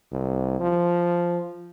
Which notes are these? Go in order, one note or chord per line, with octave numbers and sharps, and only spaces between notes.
C2
F3